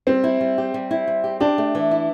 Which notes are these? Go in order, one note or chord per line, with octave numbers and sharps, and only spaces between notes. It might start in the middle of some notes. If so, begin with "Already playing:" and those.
G3 C4
E4
G3
G4
G3
E4
G3
G4
D4 G4
A3
E3
E4